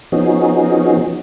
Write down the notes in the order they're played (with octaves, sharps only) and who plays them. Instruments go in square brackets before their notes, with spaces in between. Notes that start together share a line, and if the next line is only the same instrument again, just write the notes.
[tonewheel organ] F3 B3 C#4 D#4 F#4 G#4